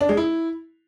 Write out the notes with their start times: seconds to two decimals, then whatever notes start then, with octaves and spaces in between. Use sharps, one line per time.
0.01 D4
0.09 G#3
0.17 E4